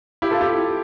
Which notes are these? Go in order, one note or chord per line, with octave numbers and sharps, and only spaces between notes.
E4 G4
F4 A4
E4 G4